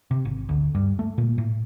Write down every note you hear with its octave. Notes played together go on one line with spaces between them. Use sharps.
C3
G#1
D2
G2
A3
A#2
A2